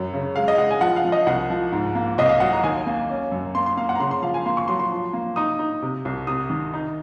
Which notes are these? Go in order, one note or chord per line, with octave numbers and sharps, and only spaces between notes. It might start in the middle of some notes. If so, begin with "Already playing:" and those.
Already playing: F#2 F#3
C#3
G#3 F5
D#5
G#3 F#5
G#5
F3 F#5
F5
F3
D#5
C2 F#5
F3
G#2
A#3
C2 D#5
F5
F#3 F#5
A#5
D#2 G#5
A#3
C#4
F#2
A#3 C6
C6
A#3 F5
F#5
A#5
C#3 C6
C6
F3 F5
G#5
A#3 C6
C#6
F#3 C6
C6
F3
A#3
D#4 D#6
D#4
C3
C2
C3 D#6
D#3
D#4